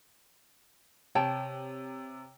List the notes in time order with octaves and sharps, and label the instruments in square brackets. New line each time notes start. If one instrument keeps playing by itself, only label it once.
[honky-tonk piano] C3 [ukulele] C#5 G5 A5